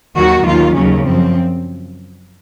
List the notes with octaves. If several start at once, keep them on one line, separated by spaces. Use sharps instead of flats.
D#2 D#3 F#3 F#4
D#2 D#3 F#3 F4
D#2 C#3 F#3 C#4
F#2 F3 C4